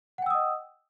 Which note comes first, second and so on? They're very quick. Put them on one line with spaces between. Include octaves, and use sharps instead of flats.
F#5 G5 E6 D#6 D#5